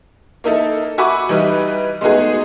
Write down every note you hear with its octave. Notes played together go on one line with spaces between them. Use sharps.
A#3 D#4 E4 A4
F#4 E5 G#5 B5 C#6 D6
E3 G3 D#4 E4 B4
G#3 A3 B3 D#4 F#4 G#4